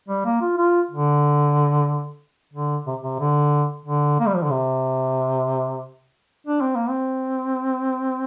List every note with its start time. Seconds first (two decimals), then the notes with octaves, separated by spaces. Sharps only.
0.09 G3
0.25 A#3
0.41 F4
0.57 F4
0.91 D3
2.53 D3
2.86 C3
3.03 C3
3.19 D3
3.85 D3
4.20 A#3
4.27 G3
4.35 F3
4.43 D3
4.51 C3
6.47 D4
6.61 C4
6.76 A#3
6.89 C4